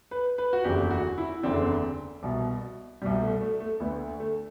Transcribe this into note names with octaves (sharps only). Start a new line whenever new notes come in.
B4
B4
F#4
F#1 E2 D3 G4
F#4
E4
F#1 E2 D3 C4
C2 B2
C2 B2 G3
A3
A3
A3
D2 D3 B3
A3